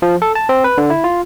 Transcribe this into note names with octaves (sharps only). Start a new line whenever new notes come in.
F3
A4
A5
C4
B4
D3
E4
F4